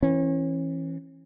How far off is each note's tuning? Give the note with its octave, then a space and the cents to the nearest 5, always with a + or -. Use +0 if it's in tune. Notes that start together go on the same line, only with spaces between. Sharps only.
E3 +0 C#4 -35